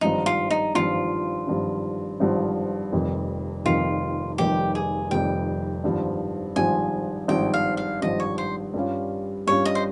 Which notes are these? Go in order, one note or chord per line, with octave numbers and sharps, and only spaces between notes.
G#1 G2 F3 D#4
F4
D#4
G#1 G2 F3 F4
G#1 G2 F3
G#1 G2 F3
F1 F2 D#3 G3
F1 F2 D#3 G3 F4
F1 F2 D#3 G3 G4
G#4
F1 F2 D#3 G3 G5
G#1 G2 F3
G#1 G2 F3 G#5
G#1 G2 F3 G5
F5
F5
G#1 G2 F3 D#5
C#5
C5
G2 G3 C#4 F4
G2 G3 C#4 F4 C#5
D#5
C5